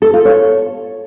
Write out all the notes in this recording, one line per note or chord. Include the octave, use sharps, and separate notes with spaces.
A4
F4
C#5